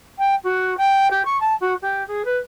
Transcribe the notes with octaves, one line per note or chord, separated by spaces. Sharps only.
G5
F#4
G5
G4
C#6
A5
F#4
G4
G#4
B4